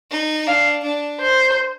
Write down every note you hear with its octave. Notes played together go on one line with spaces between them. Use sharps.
D#4
D4 F5
D4
C5